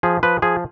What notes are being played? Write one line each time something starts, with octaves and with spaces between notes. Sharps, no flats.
F3 G#4
F3 B4
F3 G#4